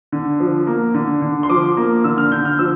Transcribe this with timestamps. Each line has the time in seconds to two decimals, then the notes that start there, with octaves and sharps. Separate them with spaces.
0.12 D3
0.40 F3
0.67 A#3
0.94 D3
1.22 D3
1.43 C6
1.49 F3 D6
1.77 A#3
2.04 D3 E6
2.18 F6
2.31 D3 G6
2.45 F6
2.59 F3 E6